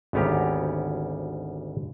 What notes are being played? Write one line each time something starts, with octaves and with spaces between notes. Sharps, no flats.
G#1 D2 B3 C#4 G4 A#5